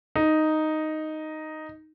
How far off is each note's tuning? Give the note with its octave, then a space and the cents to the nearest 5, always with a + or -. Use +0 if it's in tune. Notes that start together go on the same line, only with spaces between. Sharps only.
D#4 +0